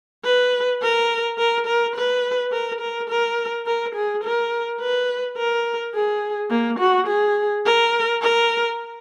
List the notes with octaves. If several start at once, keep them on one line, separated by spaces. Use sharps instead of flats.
B4
A#4
A#4
A#4
B4
A#4
A#4
A#4
A#4
G#4
A#4
B4
A#4
G#4
A#3
F#4
G#4
A#4
A#4